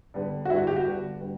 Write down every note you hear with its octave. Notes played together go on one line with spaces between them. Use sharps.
D3 G3 B3
F#4
D3 G3 B3 E4
F#4
G4
F#4
D3 G3 B3
D3 G3 B3